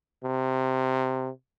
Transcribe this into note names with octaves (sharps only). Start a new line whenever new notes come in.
C3